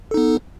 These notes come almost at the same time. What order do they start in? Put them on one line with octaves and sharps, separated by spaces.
A4 D#4 B3